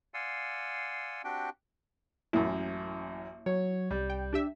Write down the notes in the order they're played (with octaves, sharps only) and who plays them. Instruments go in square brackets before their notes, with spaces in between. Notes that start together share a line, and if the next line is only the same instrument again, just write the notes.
[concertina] D5 F5 F#5 G#5 C6 E6
C4 D4 F#4 G4 G5
[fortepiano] A1 F#2 [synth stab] A#3 E4
[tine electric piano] F#3 [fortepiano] C#5
[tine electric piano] C2 G6 [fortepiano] G3
[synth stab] G5
D4 G4 E5